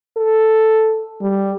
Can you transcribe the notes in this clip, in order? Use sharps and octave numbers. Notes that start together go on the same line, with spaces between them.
A4
G3